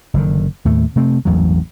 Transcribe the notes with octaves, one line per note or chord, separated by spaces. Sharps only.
F#1 D3 D#3
D#2 A2 A3
C3 A3 C4
A1 E2 G2 F#3